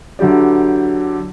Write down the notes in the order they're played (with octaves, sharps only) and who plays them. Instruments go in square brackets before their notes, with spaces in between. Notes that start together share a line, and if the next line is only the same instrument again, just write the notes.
[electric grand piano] D3 F#3 E4 G4 D5